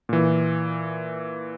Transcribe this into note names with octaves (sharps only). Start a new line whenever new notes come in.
A#2 E3